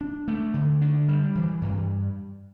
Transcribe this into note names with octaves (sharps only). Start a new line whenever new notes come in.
D4
A3
D3
D4
G3
E3
G2